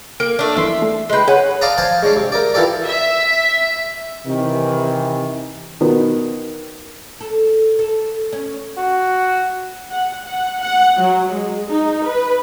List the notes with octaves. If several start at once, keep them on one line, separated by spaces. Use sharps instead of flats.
A#3 D7
A3 D4
G1 E3 E5 C6
A3
G#3 B4 G5 C6
G#4 B4 C#5 F#5
D5 F5 A5 A#5 D#6
C5 F5 G#5 A5
G#3 C#4 D4
C3
A#4 D5
E3 F4 G4 A4 D5
E5
C3 D#3 E3
B2 D#3 B3
A4
A4
C#4
F#4
F#5
F#5
F#5
F#3
G#3
D#4
B4